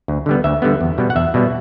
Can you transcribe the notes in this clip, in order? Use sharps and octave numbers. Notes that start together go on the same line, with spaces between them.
D2
D3 G3 B3
D2 E5
D3 G3 B3
E2
B2 G3 B3
F#5
E2 E5
B2 G3 B3